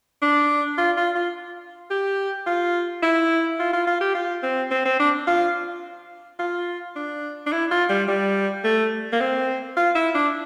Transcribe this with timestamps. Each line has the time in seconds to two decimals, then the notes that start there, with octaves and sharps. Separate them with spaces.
0.22 D4
0.78 F4
0.97 F4
1.15 F4
1.90 G4
2.46 F4
3.03 E4
3.59 F4
3.73 F4
3.87 F4
4.01 G4
4.15 F4
4.43 C4
4.71 C4
4.85 C4
4.99 D4
5.27 F4
6.39 F4
6.96 D4
7.46 D4
7.52 E4
7.71 F4
7.90 G3
8.08 G3
8.64 A3
9.12 A#3
9.20 C4
9.77 F4
9.95 E4
10.14 D4